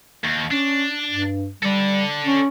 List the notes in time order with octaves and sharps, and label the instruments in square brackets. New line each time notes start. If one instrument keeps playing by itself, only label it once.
[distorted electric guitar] D#2
[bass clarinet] C#4 [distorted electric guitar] D4
[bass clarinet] G2
[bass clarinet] G3 [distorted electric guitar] A4 D5
[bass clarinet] C#4